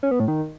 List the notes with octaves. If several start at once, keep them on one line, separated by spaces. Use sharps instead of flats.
C#4
B3
A2
D#3